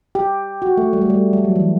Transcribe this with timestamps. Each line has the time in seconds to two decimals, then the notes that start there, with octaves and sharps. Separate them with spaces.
0.15 G4
0.62 F#4
0.77 A3
0.93 G3
1.01 A3
1.10 G3
1.33 G3
1.44 F#3
1.56 E3